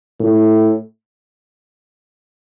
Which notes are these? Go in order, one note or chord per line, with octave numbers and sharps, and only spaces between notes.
A2